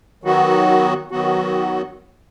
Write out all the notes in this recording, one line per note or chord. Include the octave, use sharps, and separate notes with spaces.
D#3 F#3 B3 F#4
D#3 F#3 B3 F#4